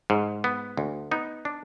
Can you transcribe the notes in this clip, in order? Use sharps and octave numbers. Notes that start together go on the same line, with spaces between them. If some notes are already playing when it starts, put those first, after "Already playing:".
G#2
B3
D2
B3 D#4
D4